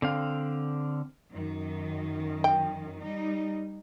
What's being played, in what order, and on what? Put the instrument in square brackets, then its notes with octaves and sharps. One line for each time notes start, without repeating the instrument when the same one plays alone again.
[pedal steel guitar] D3 C4 F5
[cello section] F#2 D#3
[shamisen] G5
[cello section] G3 D#4